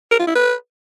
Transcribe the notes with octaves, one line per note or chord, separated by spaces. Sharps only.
A#4
F4
E4
B4